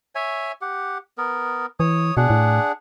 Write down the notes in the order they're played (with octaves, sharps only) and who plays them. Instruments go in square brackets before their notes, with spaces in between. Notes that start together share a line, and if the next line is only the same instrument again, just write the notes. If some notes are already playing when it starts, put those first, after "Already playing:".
[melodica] C#5 E5 G#5
G4 F#5
B3 A#4
[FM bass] E3 [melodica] C#5 D#6
[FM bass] B2 [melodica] D4 G#4 F#5
[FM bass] A2